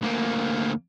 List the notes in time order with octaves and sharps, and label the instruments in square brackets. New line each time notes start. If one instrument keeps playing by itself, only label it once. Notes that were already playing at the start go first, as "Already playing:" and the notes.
[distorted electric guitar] D2 A#3